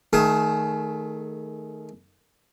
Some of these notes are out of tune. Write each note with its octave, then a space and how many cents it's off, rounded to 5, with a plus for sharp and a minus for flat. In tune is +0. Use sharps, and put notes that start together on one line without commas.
D#3 +0 A3 +0 G#4 +25